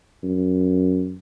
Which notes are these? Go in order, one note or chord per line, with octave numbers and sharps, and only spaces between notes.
F#2